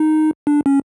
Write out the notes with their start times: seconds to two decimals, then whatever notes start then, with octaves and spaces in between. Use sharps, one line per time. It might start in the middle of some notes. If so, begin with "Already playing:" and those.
Already playing: D#4
0.47 D4
0.66 C#4